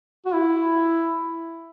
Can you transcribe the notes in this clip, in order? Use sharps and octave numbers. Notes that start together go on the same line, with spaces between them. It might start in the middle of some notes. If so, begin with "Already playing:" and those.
F#4
E4